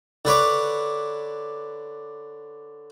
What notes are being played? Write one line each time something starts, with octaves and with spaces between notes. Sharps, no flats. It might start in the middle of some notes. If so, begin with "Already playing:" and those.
D3 B4 C#5 D6